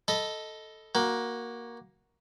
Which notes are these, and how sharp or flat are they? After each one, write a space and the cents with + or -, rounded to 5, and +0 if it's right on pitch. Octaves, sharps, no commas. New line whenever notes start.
A4 +0 D#5 +5 B5 +0
A#3 +10 F#4 +0